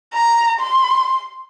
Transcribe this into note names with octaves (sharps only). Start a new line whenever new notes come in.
A#5
C6